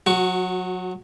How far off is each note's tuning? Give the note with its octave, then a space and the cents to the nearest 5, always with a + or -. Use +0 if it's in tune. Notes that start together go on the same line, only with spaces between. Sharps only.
F#3 -30 F#4 +0 C#6 +20